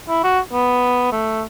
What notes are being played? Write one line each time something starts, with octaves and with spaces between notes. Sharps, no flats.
E4
F#4
B3
A3